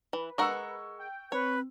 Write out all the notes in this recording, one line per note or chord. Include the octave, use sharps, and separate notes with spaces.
E3 B4
G#3 A#4 F#5 C#6 E6
G5
C4 B4 C#5